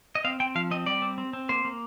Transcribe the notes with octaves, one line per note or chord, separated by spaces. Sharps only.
D#5
C4 F5
C4 G5
F3 F5
C4 D#5
G3 D5
C4
C4
C4
A#3 C5
A#3